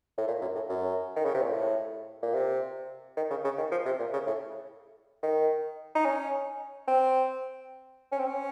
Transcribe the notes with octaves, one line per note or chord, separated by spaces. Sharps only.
A2
A#2
F#2
A2
F#2
D#3
C#3
C3
A#2
A2
A#2
C3
D#3
C#3
C#3
D#3
F3
C3
A#2
C#3
A2
D#3
D#4
C#4
C4
C#4
C4
C#4